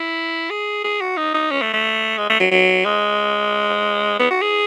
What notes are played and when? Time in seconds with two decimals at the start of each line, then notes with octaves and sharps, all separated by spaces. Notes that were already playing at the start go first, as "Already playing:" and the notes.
Already playing: E4
0.50 G#4
0.84 G#4
1.01 F#4
1.17 D#4
1.34 D#4
1.51 C#4
1.61 A3
1.73 A3
2.18 G#3
2.29 A3
2.40 F#3
2.51 F#3
2.85 G#3
4.19 B3
4.30 F#4
4.41 G#4